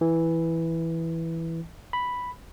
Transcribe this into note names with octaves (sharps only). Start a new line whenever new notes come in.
E3
B5